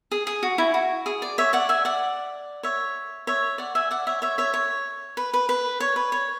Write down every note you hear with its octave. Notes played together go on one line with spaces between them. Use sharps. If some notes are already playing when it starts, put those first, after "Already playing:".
G#4
G#4
F#4
E4
F#4
G#4
D5
C#5 E5
D5 F#5
E5 G#5
D5 F#5
C#5 E5
C#5 E5
D5 F#5
E5 G#5
D5 F#5
C#5 E5
C#5 E5
C#5 E5
C#5
B4
B4
B4
C#5
B4
C#5